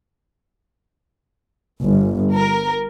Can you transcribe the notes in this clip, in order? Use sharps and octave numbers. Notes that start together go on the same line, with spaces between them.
G1
A#4